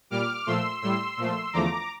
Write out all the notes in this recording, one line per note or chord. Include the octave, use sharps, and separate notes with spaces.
A#2 G3 D6 F6
A#2 F3 A3 C6 E6
A2 G3 C6 E6
A#2 F3 A3
E2 D3 F3 A3 A#5 D6